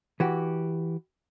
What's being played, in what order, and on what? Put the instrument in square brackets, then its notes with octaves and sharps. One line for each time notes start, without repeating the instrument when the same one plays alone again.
[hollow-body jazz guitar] E3 F#4 G4